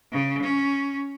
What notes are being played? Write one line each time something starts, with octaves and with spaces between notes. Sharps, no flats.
C#3
C#4